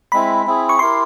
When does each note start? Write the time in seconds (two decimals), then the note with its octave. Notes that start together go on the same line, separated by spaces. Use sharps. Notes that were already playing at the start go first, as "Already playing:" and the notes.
0.12 G#3 C4 E4 B5
0.46 C4 E4 G#4
0.69 C#6
0.79 E4 G4 A#4 C6